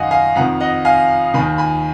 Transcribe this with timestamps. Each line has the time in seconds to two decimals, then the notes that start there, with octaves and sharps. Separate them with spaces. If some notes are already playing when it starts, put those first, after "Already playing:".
Already playing: F#2 D#3 D#5 F5 F#5 G#5
0.11 F5 G#5
0.35 F2 F#5 A#5
0.39 D#3
0.60 D#5 F#5
0.85 F5 G#5
1.34 D#3 G#5 B5
1.38 D#2
1.58 G#5 B5